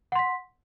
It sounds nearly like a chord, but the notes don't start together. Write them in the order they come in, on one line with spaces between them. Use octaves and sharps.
F#5 C6 B6